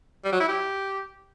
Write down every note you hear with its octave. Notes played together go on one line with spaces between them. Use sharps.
G3
F#3
E4
G4